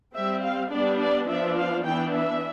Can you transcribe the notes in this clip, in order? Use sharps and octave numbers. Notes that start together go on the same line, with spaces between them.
G3 C4 E5
F5
G3 B3 D4 D5
D5
F3 B3 D4 E5
F5
E3 B3 D4 G5
E5